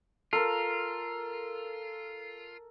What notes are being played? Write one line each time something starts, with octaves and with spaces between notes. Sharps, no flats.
F4 A4 A#4